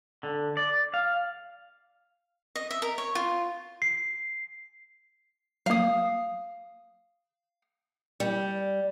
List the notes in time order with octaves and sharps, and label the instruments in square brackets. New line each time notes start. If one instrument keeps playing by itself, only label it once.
[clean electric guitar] D3
D5
F5
[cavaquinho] D#5
E5
A#4
C#5
F4
[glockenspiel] C7
[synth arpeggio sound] F#3 A#3 [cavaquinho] F5 D#6
[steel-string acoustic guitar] G3